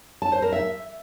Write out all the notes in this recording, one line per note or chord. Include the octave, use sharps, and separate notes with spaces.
A5
C5
A#4
E5